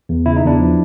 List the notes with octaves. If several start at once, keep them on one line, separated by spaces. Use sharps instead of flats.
E2
C#3 E4
D#4
E2 D4 E4
F3